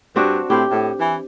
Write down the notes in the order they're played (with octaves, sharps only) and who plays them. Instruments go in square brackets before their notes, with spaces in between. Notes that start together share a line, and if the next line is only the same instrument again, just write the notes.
[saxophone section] G2 [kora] C4 D4 F#4
[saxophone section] A2 C4 E4 [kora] G4
[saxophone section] A2
E3